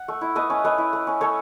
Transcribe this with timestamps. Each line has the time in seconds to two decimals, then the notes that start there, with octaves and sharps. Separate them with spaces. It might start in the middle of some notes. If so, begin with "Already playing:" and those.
Already playing: F#5
0.08 A3
0.21 E4
0.35 A3 B4 D#5
0.50 C#4
0.64 A3 B4 D#5
0.78 E4
0.93 A3
1.07 C#4
1.21 A3 A4 C#5